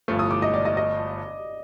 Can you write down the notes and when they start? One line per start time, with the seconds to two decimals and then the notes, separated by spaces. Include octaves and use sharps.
0.08 G1 G2 F3 A3
0.19 D#6
0.31 D6
0.42 D#5
0.54 D5
0.65 D#5
0.77 D#5